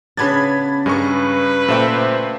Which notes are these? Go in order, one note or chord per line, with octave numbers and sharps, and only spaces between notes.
C#3 B3 D4 B5 G#6 A6
G2 G#3 A#4 B4 C#6
A#2 A3 C5 E5 G5